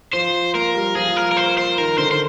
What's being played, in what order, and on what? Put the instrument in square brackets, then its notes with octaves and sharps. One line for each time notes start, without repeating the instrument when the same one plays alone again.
[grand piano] F3 [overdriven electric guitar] C5
[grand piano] A#3 [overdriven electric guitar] A#4
[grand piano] G3
[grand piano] F3 [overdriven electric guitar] G#4
[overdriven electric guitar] A#4
A#4
C5
C5
[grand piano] D#3 [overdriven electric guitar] A#4
[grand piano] D3 [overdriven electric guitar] C5
[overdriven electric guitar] C5